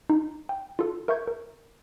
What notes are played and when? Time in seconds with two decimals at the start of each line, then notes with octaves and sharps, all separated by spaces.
0.10 D#4
0.49 G5
0.79 F4 F#4 A4
1.08 A#4 E5 C#6 G6 G#6
1.27 A#4